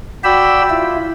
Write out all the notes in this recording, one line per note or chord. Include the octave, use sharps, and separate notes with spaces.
F#4 D5 G5 B5 E6
E4 F4